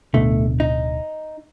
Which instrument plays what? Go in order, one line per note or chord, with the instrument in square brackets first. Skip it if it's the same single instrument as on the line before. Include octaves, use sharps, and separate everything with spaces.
[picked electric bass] D1 B2 D3 [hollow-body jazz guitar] A3
[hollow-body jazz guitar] D#4